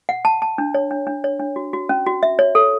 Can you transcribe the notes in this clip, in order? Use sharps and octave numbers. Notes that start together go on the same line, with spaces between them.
F#5
A5
A5
D4
C#5
D4
D4
C#5
D4
F#4
F#4
C#4
F#4
E5
C#5
A4